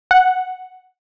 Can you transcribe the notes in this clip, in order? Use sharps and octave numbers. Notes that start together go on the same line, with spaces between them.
F#5